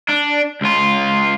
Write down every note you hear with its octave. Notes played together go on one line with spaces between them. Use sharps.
D4
C#2 F4